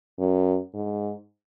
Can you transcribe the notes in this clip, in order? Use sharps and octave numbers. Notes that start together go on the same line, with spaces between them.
F#2
G#2